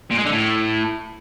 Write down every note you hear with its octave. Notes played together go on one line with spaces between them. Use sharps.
A#2
G#3
D3
A2